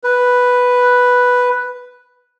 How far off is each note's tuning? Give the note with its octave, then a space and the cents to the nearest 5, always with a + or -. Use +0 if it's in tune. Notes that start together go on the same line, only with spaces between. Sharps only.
B4 +0